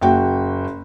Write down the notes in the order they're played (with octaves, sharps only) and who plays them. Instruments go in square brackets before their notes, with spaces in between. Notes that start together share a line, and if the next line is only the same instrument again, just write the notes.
[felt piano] F#1 F#4 G5